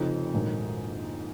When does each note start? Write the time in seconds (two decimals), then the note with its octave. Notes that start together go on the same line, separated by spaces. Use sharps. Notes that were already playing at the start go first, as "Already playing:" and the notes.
Already playing: F1 F2 C#3 F3 D#4
0.33 A#1 G#2 D#3 F#3